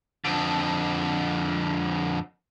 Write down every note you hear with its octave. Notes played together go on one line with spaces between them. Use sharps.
F2 D3